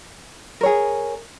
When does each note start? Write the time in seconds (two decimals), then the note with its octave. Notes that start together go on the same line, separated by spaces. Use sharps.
0.61 A#4
0.63 C#5
0.66 G#4